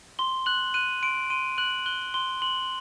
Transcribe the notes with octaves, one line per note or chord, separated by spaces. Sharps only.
C6 G7
F#6 F#7
F#6 D#7
C6 D7
C6 D#7
F#6 F#7
F#6 G7
C6 G7
C6 F#7